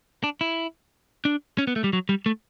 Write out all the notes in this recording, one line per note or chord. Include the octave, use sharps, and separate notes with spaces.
D4
E4
D4
C#4
B3
A3
G3
F#3
G3
A3